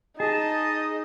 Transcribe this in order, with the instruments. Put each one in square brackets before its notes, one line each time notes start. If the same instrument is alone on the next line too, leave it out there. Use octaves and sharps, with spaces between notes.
[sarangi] D#4 [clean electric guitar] G#4 [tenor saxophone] D#5 [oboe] A5